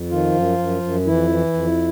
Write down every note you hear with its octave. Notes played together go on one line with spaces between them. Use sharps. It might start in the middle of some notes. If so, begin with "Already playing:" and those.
Already playing: F2
D#3 F3 F4
F#2
F#2
F#2
F2 E3 E4
E3
F2